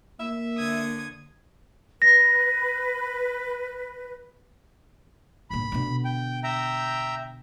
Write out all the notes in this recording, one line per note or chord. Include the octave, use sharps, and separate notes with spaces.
A#3 E5
D3 D#6 G#6
B4 A#6
G2 A#2 B5
B2 D3
G5
E5 G5 A#5